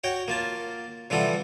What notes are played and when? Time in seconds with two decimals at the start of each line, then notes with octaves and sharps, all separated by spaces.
0.04 F#4 C#5 G5
0.28 A#3 F4 A5
1.10 C3 E3 F3 G3 A4 F#5